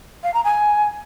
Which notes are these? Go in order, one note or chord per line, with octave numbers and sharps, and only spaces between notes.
F5
A#5
G#5